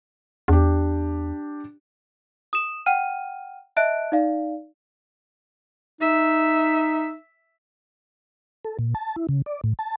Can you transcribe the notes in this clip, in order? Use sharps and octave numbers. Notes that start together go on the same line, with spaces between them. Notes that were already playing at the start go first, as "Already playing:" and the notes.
E2 D4 G4
D#6 E7
F#5 G5 F6 D#7
D#5 E5 A5 F#6 D7
D#4 D5 F5
D#4 E5
A4
A#2
A5
E4
C#3
D5
A2
A5